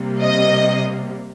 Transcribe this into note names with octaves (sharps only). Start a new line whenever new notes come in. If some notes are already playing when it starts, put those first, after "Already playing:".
Already playing: C3 G3 A#3
D#5